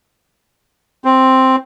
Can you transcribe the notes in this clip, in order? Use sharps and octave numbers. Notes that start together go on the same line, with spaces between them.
C4